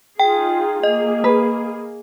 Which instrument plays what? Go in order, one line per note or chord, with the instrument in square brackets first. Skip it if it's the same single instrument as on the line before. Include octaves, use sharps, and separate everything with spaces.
[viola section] D#4 F4 G#4 [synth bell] G5
[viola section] A#3 G#4 [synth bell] D#5
[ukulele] B4